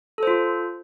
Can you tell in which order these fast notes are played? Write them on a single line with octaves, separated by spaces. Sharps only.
A4 C5 F4